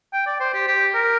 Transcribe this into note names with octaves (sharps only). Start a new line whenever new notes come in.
G5
D5
C5
G4
G4
A#4